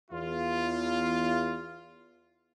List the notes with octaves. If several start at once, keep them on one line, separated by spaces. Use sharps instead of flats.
E2 F4